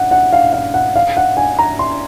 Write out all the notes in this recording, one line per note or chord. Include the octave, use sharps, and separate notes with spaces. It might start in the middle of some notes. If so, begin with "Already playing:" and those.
Already playing: F#5
F#5
F5
F5
F#5
F5
F#5
G#5
A#5
C6